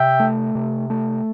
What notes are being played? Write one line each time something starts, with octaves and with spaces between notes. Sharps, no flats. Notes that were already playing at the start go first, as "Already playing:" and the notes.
Already playing: C3 E5 G5
A3
C3
A3